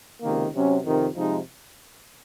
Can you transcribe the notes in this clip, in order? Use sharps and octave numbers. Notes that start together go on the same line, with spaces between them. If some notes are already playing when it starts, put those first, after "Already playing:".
C#2 C3 D#3 A#3
C3 F#3 C#4
F2 C3 D#3
C3 F3 G#3 D#4